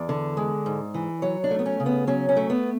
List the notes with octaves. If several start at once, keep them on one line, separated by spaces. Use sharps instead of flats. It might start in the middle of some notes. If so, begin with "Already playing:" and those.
Already playing: E2 D5
D3
G#3
G#2
E3
F#3 C#5
D4
A3
B3
C#4
C#3
B3
F#3 C#4
C#4
A3
B3